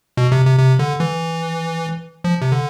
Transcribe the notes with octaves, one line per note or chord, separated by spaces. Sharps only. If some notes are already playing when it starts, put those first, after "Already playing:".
B2
C3
C3
C3
D3
E3
F3
C3
D3